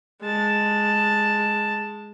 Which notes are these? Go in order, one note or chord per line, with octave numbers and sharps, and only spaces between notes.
G#3 A5